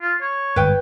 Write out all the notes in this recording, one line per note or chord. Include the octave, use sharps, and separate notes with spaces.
F4
C#5
G1 G#2 B4 G5